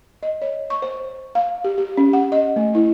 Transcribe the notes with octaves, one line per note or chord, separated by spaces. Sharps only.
D#5
C#5
C#6
C5
F5
G4
G4
C#4
F#5
D#5
A3
E4